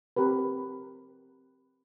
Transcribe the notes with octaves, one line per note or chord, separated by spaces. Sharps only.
C4 G4 A#4 B4